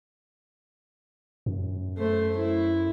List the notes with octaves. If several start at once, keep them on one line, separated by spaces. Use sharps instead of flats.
F#2
A3 C5
E4